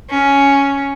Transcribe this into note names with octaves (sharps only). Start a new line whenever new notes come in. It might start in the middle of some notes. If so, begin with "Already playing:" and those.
C#4